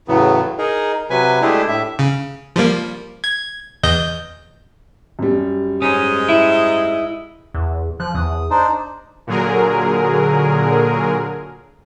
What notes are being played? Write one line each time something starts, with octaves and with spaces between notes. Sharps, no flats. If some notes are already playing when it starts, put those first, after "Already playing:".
E2 A2 C#3 F#3 B3
D#4 G#4 A#4
C3 F#3 B4 G#5
G#3 A3 D4 E4 G4
A2 E5
C#3
F3 G3 A#3
G#6
E2 D#5 G6
F#2 G3
G#2 C#4 D#5
E4
E2
F3 F#6
E2 D#6
D4 D#4 C5
A#2 D3 F#3 G#4 A#4